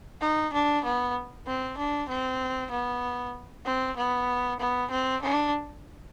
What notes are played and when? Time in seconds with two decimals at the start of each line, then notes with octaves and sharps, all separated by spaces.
0.21 D#4
0.53 D4
0.84 B3
1.47 C4
1.78 D4
2.09 C4
2.71 B3
3.65 C4
3.97 B3
4.60 B3
4.91 C4
5.22 D4